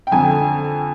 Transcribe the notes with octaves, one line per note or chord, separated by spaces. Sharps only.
G5
F2 D3 G#5